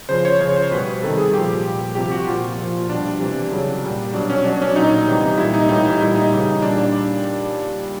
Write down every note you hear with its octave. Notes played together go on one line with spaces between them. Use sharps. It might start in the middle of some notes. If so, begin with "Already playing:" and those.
C#3 F3 C5
C#5
C#3 F3 C#5
C5
B2 G3 B4
C3 D#3 G3 A4
G#4
A#2 F3 G4
A#2 G3
C3 F3 G4
F#4
A#2 F3 F4
A#2 F3
B2 G3 D4
C3 E3 G3
C#3 F#3
A#2 G3
B2 F#3 D4
C#4
B2 F#3 D4
C#4
D4
A#2 F#3 D#4
C3 E3 G3
A#2 G3 E4
D#4
A2 E3 G3 D#4
E4
A#2 G3 E4
D#4
C#3 E3 G3
A#2 G3 D4
D4